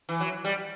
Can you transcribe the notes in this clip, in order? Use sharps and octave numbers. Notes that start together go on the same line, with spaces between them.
E3
F#3
G3